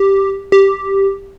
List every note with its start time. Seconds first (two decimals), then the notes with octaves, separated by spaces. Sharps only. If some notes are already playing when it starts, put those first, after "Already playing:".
Already playing: G4
0.52 G4